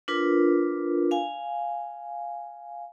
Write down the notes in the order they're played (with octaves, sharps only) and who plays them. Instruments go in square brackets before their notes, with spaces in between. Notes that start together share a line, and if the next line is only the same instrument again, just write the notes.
[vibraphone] D4 F4 A#4 B4
F5 G#5